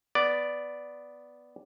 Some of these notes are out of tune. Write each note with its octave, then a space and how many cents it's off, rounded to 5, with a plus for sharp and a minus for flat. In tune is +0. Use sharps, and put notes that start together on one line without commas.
B3 +0 D5 +0